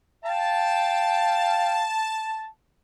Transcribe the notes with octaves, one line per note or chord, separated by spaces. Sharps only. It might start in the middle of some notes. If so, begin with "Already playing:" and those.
F5 G5 A5